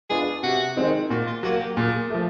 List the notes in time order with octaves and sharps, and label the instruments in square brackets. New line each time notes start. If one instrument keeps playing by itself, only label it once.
[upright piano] G#3 B3 D4 F4 [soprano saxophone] G#4
[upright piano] C3 [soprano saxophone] F#4
[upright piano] D#3 G#3 C4 D#4
[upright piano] A#2 [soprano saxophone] F#4
[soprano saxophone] F4
[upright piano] F#3 A#3 [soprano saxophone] F#4
[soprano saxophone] G4
[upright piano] A#2 [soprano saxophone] G#4
[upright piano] F3 A3